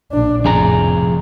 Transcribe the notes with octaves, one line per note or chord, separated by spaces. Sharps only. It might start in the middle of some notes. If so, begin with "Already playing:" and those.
A#1 D4
F1 F2 A2 G#4 A#5